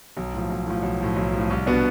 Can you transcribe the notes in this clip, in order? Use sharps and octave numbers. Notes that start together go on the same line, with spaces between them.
B1
A2 F3
B1
A2 F3
B1
A2 F3
B1
A2 F3
C2
B2 B3 D4